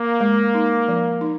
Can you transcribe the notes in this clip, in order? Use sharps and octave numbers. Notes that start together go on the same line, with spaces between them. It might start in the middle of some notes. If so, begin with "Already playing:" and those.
Already playing: A#3
G#3
D#4
F3
D#4